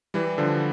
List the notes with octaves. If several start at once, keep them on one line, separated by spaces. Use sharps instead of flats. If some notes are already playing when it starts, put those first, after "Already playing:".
E3 G3
D3 F3